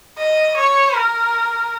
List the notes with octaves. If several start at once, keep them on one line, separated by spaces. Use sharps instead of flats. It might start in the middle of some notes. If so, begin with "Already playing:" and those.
D#5
C#5
A#4